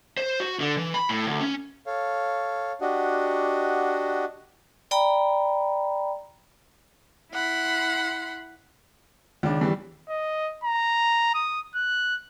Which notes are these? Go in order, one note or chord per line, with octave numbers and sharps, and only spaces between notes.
C5
F#4
D3
E3
B5
A2
D2
C#4
A4 C#5 F5
D4 F#4 G4 D#5 F#5
D5 G5 A#5 B5
E4 F#5 B5 C6
C#2 D#3 D4
G2 E3 G3
D#5
A#5
D#6
F#6